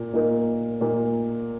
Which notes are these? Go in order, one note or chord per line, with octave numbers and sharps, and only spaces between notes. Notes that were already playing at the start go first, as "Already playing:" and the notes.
Already playing: A#2 A#3
A#2 A#3 D#4 A#4
A#2 A#3 D#4 A#4